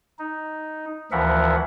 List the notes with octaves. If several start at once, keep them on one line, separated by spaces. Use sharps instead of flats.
D#4
D2 E3 F3 A#4 E5 F#5